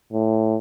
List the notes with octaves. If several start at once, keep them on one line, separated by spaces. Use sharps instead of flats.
A2